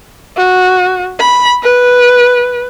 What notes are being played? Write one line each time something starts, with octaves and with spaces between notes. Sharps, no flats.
F#4
B5
B4